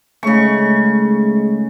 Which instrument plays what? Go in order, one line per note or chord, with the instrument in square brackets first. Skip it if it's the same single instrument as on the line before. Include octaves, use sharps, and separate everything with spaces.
[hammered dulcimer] C#3 C#6 [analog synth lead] G#3 [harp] A3 C#4 D#4